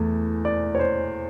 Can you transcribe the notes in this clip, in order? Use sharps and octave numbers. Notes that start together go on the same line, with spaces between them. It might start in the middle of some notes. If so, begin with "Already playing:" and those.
Already playing: E2 E3 A3
D5
C#5
C5